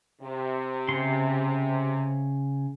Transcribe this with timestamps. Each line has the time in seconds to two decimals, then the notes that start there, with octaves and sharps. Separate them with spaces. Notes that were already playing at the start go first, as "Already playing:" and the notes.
0.21 C3
0.88 C#3 C6